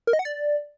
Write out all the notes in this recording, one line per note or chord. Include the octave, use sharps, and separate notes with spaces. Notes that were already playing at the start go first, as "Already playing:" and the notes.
A#4
D#5
F#5
D5